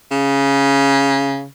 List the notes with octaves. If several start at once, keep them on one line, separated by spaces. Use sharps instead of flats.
C#3